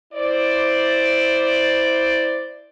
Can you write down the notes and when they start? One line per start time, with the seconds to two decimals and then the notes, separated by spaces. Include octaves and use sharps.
0.13 E4 C5 D5